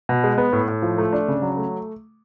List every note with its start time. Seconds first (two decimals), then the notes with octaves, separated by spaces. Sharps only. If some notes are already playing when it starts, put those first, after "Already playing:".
0.09 B2
0.24 G#3
0.38 B3
0.53 A2
0.68 A2
0.82 F3
0.98 A3
1.13 D4
1.28 C#3
1.42 F#3
1.57 A3